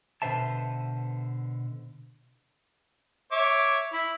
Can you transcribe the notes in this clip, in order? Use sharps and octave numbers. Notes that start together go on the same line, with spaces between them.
B2 D3 B4 C5 E5 A5
C#5 E5 D6
E4